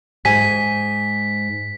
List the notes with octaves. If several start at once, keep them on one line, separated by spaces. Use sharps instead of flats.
G#2 G#5 B6